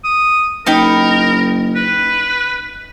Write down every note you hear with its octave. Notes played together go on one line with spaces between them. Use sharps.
D#6
F#1 D#4 A#4 G5 B5
B4